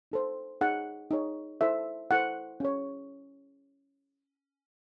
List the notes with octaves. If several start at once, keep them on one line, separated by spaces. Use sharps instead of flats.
D#4 A4 C5
D#4 G#4 C#5 F#5
D#4 G#4 C#5
E4 A4 C5 E5
E4 A4 C5 F#5
C#4 G#4 C#5